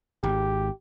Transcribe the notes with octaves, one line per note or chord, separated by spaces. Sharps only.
G#1 G4